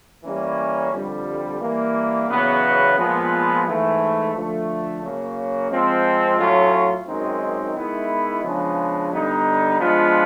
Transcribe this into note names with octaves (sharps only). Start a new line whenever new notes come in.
E3 G3 A#3 C#4
F2 D3 G3
E3 G3 A#3
E2 C#3 F#3 B3
A#2 F3 G#3 B3
G#2 E3 A3
D3 F3 A3
C#3 F#3 A#3
F3 G#3 C4
A2 F#3 A3 C#4 F4
F#2 D#3 G#3 C4 D#4
D#3 G#3 B3 E4
C#3 F3 G#3 B3 D4
D3 G3 B3 D#4
F3 G#3 B3 D4 F4